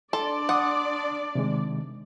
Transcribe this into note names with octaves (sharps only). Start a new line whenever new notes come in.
D4 A4 D5 C6
F#5 C6 D6 D#6
C3 D#3 G#3